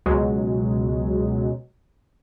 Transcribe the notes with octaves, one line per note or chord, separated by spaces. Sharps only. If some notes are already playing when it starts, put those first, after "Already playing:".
C#2 B2 F#3 G#3